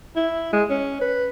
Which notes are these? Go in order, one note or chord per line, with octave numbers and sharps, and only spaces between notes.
E4
G#3
C#4
B4